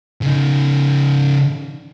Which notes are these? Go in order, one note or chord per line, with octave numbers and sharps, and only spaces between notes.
C#3 D#4